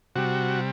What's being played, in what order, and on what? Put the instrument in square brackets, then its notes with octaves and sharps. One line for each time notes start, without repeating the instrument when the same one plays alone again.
[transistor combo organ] C3 G3 F#4